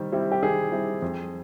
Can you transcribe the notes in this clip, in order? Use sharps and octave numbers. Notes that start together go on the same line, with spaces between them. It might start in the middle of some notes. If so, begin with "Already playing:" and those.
Already playing: D#3 G3 C4
G3 C4 E4
G4
D#3 G#4
G3 C4 E4
F2